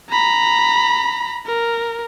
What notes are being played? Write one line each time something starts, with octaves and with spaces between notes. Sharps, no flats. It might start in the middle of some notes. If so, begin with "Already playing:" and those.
A#5 B5
A#4